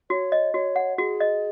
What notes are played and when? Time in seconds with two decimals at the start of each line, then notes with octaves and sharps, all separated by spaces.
0.10 F#4 C#5
0.32 D#5
0.54 F#4 C#5
0.76 F#5
0.98 F#4 G#4
1.20 D#5